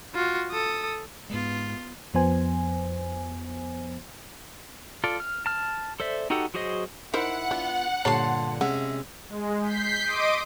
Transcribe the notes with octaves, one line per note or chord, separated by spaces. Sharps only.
F4 F#4
A4 D#6
G#2 G#3 B3 F4
F2 F3 B3 C5 G#5
F4 A4 D5
F6
A5 F6
A4 C5 D5 E5
D#4 F#4 G4 A4 F#5
F#3 F#4 G#4 C5 D#5
D#4 E4 A#4 C5 F#5
B3 D4 F4
G2 A#2 D3 G3 A4 C#5 A5 C6
C3 G#3 C#4 E5 F#5
G#3
G6 B6 C7
D#5 C6 D6 D#6 D7